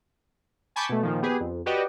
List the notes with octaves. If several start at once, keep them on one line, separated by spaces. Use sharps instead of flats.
G#5 A5 B5 C#6 D6 G6
B2 A3
A#2 D#3 F3
B3 G4 G#4 B4
F2
F#4 G4 B4 D5 D#5 G5